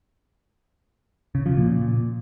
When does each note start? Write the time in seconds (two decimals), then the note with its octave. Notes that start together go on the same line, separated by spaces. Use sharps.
1.35 C#3
1.46 F3
1.57 A#2